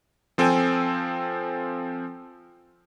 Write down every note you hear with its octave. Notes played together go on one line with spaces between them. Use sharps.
F3 C4 A4 G5 G#5